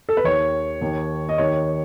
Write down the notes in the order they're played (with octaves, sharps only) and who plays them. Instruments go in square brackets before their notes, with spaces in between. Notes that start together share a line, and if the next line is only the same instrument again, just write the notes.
[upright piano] A4
B4
D#2 D#3 C#5
D#2 D#3
D#5
D#2 D#3 C#5